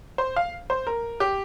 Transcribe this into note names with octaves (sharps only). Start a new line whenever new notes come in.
C5
F5
C5
A#4
G4